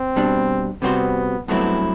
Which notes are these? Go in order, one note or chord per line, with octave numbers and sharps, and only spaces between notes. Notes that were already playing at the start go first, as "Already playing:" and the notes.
Already playing: C4
B2 G3 D4
C3 G3 B3 C4 F#4 C5
G2 F#3 A3 B3 C4 E4